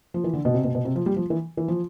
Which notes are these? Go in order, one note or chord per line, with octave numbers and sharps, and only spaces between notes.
F3
E3
D3
B2
C3
B2
B2
C3
F3
G3
F3
E3
E3
F3